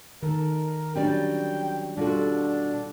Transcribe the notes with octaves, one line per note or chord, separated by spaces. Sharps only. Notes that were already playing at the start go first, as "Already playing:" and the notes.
D#3 A4 A#4
F#3 G3 C#4 D4 D5 G5
B2 G3 D4 F4 F#4 A4